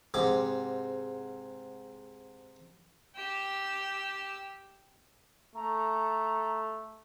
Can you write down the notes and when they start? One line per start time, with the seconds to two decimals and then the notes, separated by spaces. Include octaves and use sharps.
0.14 G#2 C3 D6
3.15 G4 E6
5.55 A3 A#5